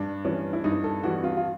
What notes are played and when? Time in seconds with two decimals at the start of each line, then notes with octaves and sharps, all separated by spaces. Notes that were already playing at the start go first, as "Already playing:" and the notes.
Already playing: G2 D4
0.25 E3 G3 C#4
0.53 E4
0.64 G2 D#4
0.84 A4
1.03 E3 G3 F#4
1.23 F4
1.37 F4